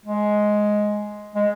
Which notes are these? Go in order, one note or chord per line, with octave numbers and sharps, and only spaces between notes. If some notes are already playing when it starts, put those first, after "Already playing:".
G#3
G#3